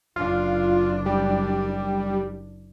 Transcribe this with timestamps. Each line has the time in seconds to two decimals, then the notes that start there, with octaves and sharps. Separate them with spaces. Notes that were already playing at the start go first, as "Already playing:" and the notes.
0.16 F#1 D4 F4
1.06 G3